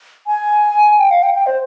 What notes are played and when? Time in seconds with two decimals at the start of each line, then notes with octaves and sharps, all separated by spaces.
0.27 G#5
0.99 G5
1.11 F5
1.23 G5
1.34 G5
1.46 C5